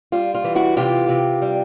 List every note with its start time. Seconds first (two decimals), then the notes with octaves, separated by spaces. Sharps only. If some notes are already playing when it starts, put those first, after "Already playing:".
0.12 G3 F4
0.35 F4
0.44 E3
0.55 E4 F#4
0.77 C3 F4 G4
1.08 C3
1.42 G3